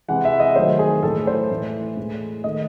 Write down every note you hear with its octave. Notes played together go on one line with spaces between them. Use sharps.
C3 E3 G#3 F#5
E5
D#5
D#3 F#3 A3 C5
G#4
A2 E3 A3 A4
C5
A2 E3 A3
A2 G#3
D#3 A3 D#5